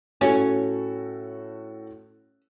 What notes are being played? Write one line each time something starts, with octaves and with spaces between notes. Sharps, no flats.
A2 C#4 F#4 A4